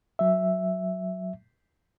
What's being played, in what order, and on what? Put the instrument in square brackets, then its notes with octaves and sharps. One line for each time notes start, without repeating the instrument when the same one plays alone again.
[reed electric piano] F#3 E5